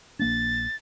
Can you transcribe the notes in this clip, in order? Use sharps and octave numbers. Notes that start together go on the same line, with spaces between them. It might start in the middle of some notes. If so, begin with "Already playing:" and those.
A#1 A#3 D4 A6